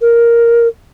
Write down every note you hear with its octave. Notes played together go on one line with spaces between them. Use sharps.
A#4